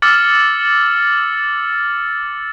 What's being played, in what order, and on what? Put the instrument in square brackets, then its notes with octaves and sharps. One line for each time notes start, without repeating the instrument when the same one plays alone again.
[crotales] D6 E6 F6 A6 C#7 F#7